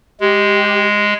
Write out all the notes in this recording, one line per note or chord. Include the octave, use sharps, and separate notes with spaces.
G#3 G4